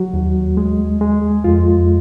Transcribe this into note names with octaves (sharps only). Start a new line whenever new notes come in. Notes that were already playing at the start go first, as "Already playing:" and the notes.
Already playing: F#3 F#4
D#2
G#3
G#3
F2 F4